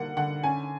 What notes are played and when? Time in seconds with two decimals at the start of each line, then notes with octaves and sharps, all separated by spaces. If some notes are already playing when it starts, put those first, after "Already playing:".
Already playing: D3 G3 A#3 F#5
0.17 D3 F#5
0.43 C#4 G#5